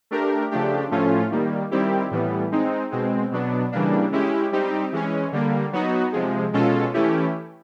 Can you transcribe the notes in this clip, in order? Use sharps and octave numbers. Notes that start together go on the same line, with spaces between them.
A3 D4 G4 A#4
C#3 F3 A3 D4 G4
A2 F3 A3 C#4 F4
D#3 G3 A#3
D#3 G3 C4 E4 G4
A2 E3 G3 B3
G#3 C4 D#4
B2 G#3 C4
B2 F#3 B3 D4
C#3 E3 G3 A#3 D4
G#3 C#4 E4 G4
G3 C4 D#4 G4
E3 G#3 C#4
D3 G3 A#3
F#3 B3 D#4 F#4
C3 F3 G#3
B2 G#3 C#4 F4 A4
E3 A3 C#4 E4 G4